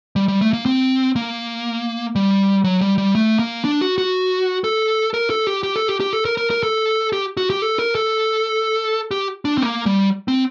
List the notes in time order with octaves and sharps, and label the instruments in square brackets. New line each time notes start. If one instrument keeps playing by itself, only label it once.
[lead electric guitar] G3
G3
A3
A#3
C4
A#3
G3
F#3
G3
G3
A3
A#3
D4
F#4
F#4
A4
A#4
A4
G4
G4
A4
G4
G4
A4
A#4
A#4
A#4
A4
G4
F#4
G4
A4
A#4
A4
G4
D4
C4
A#3
G3
C4